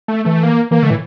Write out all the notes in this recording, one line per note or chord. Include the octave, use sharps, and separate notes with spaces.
A3
E3 A3
A#3
E3 A#3
D3 A3
A2 E3